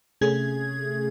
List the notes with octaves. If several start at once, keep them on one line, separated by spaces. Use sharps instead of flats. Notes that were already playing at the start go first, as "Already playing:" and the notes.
C3 A3 C#4 G#4 G#6